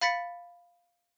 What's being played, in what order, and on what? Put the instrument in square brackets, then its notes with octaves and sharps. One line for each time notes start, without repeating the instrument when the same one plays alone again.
[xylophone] F5 B5 A6 B6 C#7